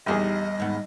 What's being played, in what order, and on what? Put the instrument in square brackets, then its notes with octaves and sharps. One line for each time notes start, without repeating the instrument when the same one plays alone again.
[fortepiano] A#1 E2 G#4 [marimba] G3 [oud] D#4 G4 [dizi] D#5
[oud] D#2 G#2 B3